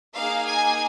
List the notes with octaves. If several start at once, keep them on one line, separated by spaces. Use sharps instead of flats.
A#3 D#4 G#4 F5
G#5